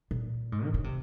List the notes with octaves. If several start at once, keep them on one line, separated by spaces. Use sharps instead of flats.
A#2
G#2
D#3
C#3
C3